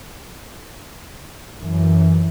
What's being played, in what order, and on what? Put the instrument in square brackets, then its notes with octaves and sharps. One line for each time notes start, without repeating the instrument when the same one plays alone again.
[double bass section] F#2 E3